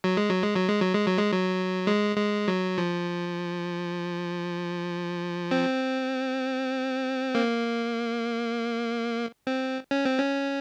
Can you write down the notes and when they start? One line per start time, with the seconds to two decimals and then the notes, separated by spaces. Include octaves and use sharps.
0.04 F#3
0.17 G#3
0.30 F#3
0.42 G#3
0.55 F#3
0.68 G#3
0.81 F#3
0.93 G#3
1.06 F#3
1.19 G#3
1.32 F#3
1.87 G#3
2.17 G#3
2.48 F#3
2.78 F3
5.51 C4
7.35 A#3
9.47 C4
9.91 C#4
10.05 C4
10.18 C#4